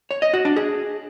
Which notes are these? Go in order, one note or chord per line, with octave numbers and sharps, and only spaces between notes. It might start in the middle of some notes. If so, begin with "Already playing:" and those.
C#5
D#5
F#4
D4
G#4